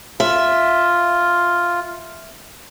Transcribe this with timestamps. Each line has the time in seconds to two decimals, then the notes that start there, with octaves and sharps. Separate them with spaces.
0.20 F4 E5